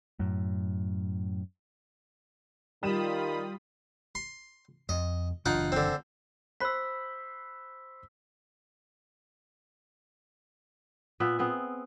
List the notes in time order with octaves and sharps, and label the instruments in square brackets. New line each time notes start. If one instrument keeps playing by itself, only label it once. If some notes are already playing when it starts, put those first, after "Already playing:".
[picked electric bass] F#2 A2
[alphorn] D#3 [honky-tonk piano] G3 E7 [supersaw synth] F4 B5 D#6
[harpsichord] C6
[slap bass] F2 [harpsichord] D#5
[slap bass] F#1 E3 D4 [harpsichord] D#4 F4 F#5
[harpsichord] D3 C4
[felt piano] C5 B5 F#6 [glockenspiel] E6 B6
[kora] A#2 B3 E5
B3 C4 G#4